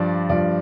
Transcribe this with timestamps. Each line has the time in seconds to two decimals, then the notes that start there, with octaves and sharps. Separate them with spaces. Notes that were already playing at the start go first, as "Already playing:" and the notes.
Already playing: G2 F3 D5
0.29 G2 F3 D5